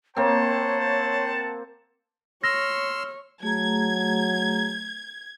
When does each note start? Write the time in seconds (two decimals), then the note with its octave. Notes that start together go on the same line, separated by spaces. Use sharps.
0.17 A#3 C4 C5 C#5 F#5 A5
2.44 C#5 C6 E6 F6 A#6
3.43 F#3 A3 G#4 A#5 G#6